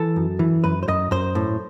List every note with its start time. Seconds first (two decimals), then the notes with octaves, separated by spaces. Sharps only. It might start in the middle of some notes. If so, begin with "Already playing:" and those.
Already playing: E3 A4
0.16 F#2
0.39 E3
0.64 F#2 B4
0.83 C5
0.88 F#2 D#5
1.11 F#2 C5
1.35 A2